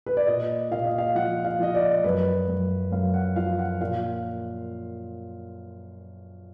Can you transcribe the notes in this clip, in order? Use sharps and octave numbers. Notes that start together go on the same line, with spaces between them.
B4
D5
A#2 D#5
A#2 F5
D#5
F5
F3 F#5
F5
F3 D#5
D5
D5
F#2 B4
F#2
F#2 F5
F#5
F3 F5
F#5
A#2 F5